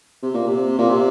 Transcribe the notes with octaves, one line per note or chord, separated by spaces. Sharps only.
C3
A#2
C3
A#2
C3